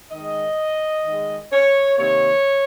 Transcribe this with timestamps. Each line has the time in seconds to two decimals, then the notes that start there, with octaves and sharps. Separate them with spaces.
0.11 D#3 G#3 D#5
1.05 D#3 G#3
1.52 C#5
1.98 C3 D#3 A#3 C#5